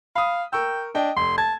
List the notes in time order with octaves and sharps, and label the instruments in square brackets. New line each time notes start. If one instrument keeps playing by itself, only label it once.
[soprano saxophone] F5 [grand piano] B5 D#6
[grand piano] A#4 C#6 E6 [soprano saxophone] G5
[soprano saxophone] D4 [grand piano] D#5 G5
[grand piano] F1 [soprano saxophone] C6
[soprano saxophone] A5 [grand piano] G#6